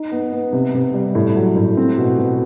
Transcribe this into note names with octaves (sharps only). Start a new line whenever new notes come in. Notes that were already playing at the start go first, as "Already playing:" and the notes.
Already playing: D#4
B3
B3
C3
C3
G3
A2
F#3
A2
C4
B2
B2